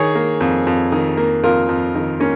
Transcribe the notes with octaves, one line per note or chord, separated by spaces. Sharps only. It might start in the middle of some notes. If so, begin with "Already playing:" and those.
Already playing: D#3 G#4 C#5
A#3
F2
F2
D#3
A#3
F2 F4 A#4
F2
D#3
A#3 C#4